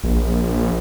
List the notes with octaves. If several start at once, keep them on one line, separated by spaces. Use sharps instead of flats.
A#1